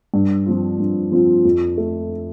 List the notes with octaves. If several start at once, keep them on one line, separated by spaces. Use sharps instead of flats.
G2
F3 C4 F4
G2
F3 C4 F4
F2
A3